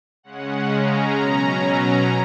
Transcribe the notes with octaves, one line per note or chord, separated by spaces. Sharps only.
C#3 G#3 C#4 F#5
A#5
B2 F#3 C#4